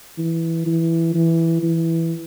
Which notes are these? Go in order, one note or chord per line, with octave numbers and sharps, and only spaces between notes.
E3
E3
E3
E3